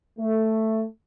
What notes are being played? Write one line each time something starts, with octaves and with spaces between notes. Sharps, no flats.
A3